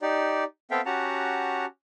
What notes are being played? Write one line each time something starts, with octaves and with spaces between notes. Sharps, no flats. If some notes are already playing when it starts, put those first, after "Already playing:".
D#4 G4 D5
B3 C4 A4 E5 F5 G5
C#4 F#4 G4 F#5 A5 A#5